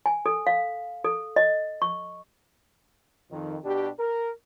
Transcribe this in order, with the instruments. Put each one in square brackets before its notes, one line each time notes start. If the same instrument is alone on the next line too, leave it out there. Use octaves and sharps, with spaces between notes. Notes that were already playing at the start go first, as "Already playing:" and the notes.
[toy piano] G#5
A4
F5
A4
D#5
C#6
[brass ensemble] F2 D#3
B2 D4 G4
A#4